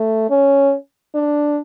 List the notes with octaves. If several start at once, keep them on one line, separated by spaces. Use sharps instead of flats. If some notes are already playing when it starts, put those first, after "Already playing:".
Already playing: A3
C#4
D4